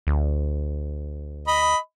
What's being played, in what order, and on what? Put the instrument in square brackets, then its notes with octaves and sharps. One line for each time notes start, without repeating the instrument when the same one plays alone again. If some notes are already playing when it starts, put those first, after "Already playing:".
[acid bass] D2
[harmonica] D#5 B5